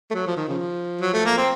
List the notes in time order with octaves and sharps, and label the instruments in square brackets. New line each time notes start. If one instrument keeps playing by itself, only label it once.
[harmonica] A3
F#3
F3
D#3
C#3 F3
F#3
A3
A#3
C4